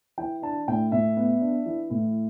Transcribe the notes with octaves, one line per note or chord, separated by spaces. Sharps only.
E3 G5
D4 A5
A2 G5
A2 E5
B3
D4
E3
A2